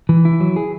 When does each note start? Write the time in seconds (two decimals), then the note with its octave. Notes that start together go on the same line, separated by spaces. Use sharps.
0.09 E3
0.25 E4
0.40 F#3
0.56 G#4